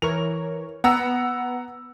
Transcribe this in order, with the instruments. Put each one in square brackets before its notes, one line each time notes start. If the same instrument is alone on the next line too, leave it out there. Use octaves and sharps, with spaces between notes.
[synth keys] E3 A#4 C#5 [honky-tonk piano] F7
[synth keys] B3 [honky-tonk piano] F#5 A#5 E6